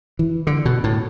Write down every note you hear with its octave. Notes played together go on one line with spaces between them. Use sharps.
E3
D3
B2
A2